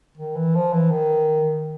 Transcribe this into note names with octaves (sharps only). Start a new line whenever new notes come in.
D#3
E3
F3
E3
D#3